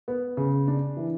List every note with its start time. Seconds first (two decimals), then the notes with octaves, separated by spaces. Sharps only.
0.08 B3
0.37 C#3
0.68 D4
0.97 E3